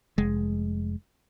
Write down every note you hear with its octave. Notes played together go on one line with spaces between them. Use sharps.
F1 G#3